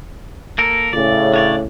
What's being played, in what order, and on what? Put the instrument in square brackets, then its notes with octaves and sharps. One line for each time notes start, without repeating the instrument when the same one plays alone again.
[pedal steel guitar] A#3 A4 A#4
[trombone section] A2 C#3 [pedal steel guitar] D5
[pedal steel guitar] D4 C#5 D5